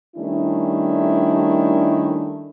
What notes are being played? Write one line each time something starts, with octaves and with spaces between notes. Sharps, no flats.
D#3 G3 A3 C#4 D4 E4